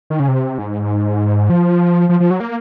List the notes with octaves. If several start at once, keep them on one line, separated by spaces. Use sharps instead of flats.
D#3
C#3
C3
G#2
F3
F3
F3
F#3
A#3